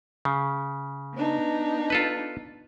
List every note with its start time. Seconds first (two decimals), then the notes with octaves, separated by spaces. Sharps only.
0.25 C#3
1.15 B3 D4 D#4
1.90 F4 A4 B4